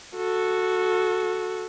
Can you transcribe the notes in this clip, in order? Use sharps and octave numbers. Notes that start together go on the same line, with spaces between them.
F#4 A4